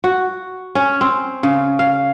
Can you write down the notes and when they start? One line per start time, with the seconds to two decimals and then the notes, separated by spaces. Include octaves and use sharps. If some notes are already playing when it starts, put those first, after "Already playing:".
0.04 F#4
0.75 C#4
1.01 C4
1.43 C#3
1.79 F5